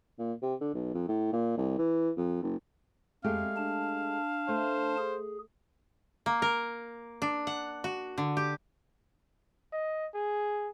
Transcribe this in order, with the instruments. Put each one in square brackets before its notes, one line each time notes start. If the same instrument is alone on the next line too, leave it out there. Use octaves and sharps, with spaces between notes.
[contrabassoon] A#2
C3
D3
B1
F2
A2
A#2
C2
E3
F2
F#1
[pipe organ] F2 [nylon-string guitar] G#3 A3 G4 [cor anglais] F5
[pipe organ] D4 A5
[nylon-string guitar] A3 [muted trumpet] C5
[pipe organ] G#4
[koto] A#3
A#4
D4
F#5
F#4
D3
G4
[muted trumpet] D#5
G#4